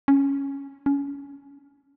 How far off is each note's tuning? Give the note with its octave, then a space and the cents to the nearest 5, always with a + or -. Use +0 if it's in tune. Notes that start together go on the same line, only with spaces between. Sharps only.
C#4 +0
C#4 +20